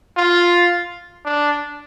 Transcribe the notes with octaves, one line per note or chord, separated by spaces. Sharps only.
F4
D4